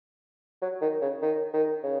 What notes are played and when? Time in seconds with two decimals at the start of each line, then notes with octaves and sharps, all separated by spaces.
0.62 F#3
0.81 D#3
1.01 C#3
1.22 D#3
1.53 D#3
1.83 C#3